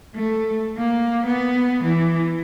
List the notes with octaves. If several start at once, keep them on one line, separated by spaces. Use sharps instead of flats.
A3
A#3
B3
E3